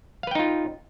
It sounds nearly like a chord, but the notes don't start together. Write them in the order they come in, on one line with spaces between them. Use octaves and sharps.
F5 B4 G5 D#4 F4